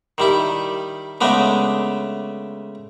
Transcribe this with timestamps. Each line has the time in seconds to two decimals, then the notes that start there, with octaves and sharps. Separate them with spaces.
0.18 D#3 G3 E4
1.21 C#3 G#3 A3 B3 D4